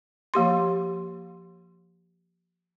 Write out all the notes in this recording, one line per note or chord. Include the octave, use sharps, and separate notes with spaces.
F3 A#3 G4 C6